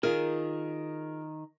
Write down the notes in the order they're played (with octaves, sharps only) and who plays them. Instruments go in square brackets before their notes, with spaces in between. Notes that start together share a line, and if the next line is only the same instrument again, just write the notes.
[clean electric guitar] D#3 [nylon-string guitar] F4 G#4 [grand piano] A#4